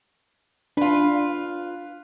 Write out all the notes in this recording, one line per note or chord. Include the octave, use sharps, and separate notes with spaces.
D4 F4 B4